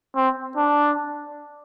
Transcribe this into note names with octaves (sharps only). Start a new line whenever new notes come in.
C4
D4